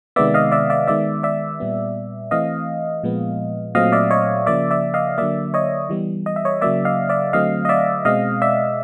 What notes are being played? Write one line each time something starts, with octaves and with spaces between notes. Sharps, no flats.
C3 D#3 G#3 B3 D5 E5
D#5 F5
D5 E5
D5 E5
D#3 G#3 B3 D5 E5
D5 E5
A#2 G3 B3
E3 A3 C4 D#5 F5
A#2 F3 G#3 B3
A#2 F#3 A3 C4 D#5 F5
D5 E5
C#5 D#5
C#3 F3 A#3 D5 E5
D5 E5
D#5 F5
D3 F#3 A#3 D5 E5
C#5 D#5
E3 G3 B3
D#5
E5
C#5 D#5
C#3 F#3 A#3 D5 E5
D#5 F5
D5 E5
D3 F#3 A3 C4 D#5 F5
D#5
D5 E5
B2 G#3 C4 D#5 F5
D5 E5